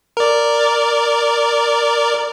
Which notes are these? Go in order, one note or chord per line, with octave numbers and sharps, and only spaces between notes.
A#4 D5